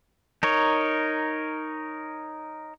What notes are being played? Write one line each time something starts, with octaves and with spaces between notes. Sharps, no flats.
D#4 A#4 C#5